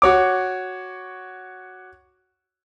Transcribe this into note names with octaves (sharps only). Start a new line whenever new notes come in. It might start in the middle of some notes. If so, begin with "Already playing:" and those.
F#4 C#5 D6